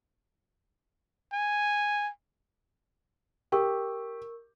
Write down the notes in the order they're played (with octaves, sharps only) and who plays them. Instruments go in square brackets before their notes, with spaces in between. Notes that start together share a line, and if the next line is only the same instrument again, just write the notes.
[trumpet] G#5
[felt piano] G4 [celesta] A#4 C#6 E6